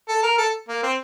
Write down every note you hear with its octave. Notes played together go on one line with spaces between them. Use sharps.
A4
A#4
A4
A#3
C4